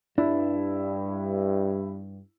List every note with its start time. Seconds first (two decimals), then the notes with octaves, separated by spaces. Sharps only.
0.18 G2 D4 E4